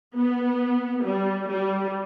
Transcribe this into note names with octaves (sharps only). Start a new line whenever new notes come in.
B3
G3
G3